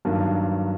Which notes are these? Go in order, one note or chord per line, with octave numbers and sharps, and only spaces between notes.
G2 D#3 F#3 A#3 D4